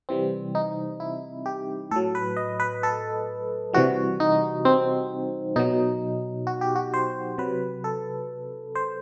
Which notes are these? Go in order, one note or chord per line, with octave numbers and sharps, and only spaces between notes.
C3 E3 G3 C4
D#4
E4
G4
A2 F#3 A4
B4
D#5
B4
A4
C3 E3 G3 F#4
D#4
C4
B2 F#3 D#4
F#4
G4
F#4
C5
C3 F#3 B4
A4
C5